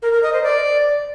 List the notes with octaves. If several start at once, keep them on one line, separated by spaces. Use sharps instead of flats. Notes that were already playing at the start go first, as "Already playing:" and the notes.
A#4
A#4
D#5
C5
D5